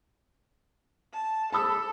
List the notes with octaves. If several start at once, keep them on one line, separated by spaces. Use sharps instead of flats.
A5
A4 A5 B5 E6